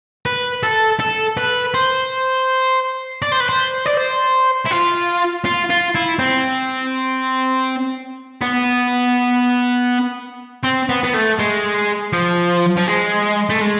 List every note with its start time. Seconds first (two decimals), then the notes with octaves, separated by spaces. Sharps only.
0.26 B4
0.63 A4
1.00 A4
1.37 B4
1.74 C5
3.22 D5
3.32 C5
3.40 B4
3.49 C5
3.86 D5
3.97 C5
4.65 E4
4.71 F4
5.45 F4
5.70 F4
5.95 E4
6.19 C4
8.41 B3
10.64 C4
10.89 B3
11.03 B3
11.14 A3
11.39 G#3
12.13 F3
12.77 F3
12.87 G#3
13.49 A3
13.61 G#3